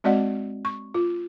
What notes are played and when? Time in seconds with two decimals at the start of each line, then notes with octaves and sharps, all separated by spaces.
0.04 G#3 C4 F#4 D5 D#5 F#5
0.65 C#6
0.94 F4